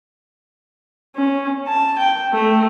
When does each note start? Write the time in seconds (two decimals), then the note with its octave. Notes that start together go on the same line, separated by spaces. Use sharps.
1.16 C#4
1.68 A5
1.99 G5
2.33 A3